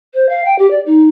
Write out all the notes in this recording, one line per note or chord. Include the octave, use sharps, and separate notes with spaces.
C5
F5
G5
G4
D5
D#4